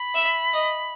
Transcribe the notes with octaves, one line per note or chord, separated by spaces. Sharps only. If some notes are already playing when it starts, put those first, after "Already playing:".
Already playing: B5
E5
D#5